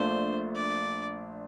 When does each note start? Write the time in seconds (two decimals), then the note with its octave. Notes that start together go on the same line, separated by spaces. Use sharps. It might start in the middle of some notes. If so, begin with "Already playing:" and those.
Already playing: A#1 A#2 A3 D4 C5
0.55 D5